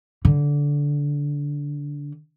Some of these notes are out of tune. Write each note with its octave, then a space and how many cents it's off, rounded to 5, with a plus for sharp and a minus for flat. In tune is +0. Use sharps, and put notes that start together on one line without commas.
D3 -20